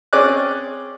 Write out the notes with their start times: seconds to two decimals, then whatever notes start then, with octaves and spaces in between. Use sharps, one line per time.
0.13 C4 C#4 G#4 D5 D6 F#6